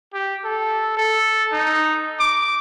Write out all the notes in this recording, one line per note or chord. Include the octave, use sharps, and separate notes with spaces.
G4
A4
A4
D#4
D6